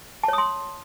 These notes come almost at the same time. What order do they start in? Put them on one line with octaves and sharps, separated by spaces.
A5 C#5 D#6 C6